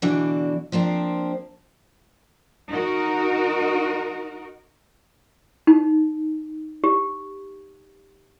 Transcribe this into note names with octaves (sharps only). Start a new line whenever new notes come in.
B2 D3 E3 D4 F#4
F3 A#3 C4 D4
D#4 F#4 A#4
D#4
G4